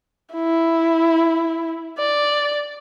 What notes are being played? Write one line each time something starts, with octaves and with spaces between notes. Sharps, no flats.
E4
D5